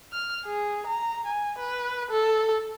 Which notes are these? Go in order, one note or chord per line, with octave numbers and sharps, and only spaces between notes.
F6
G#4
A#5
G#5
B4
A4